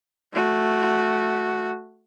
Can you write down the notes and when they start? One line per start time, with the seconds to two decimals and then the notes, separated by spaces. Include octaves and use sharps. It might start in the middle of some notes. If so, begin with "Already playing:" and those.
0.34 A3 F#4